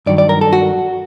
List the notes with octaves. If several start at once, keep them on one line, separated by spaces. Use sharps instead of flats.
G2 D#3 F#3 D5
D5
A#4
A4
F#4